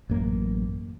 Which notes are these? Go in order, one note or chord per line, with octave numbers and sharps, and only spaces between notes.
A1 F#2 A#3